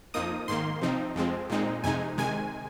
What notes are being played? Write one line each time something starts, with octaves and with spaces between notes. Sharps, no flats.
F2 F3 A#3 D#4 D#6
G#2 D#3 A#3 C6
C3 F3 C4 D#4
F2 F3 G#3 C4
A#2 G#3 C4 D#4
F2 C3 G#3 D#4 G#5
C3 D#3 G#3 G#5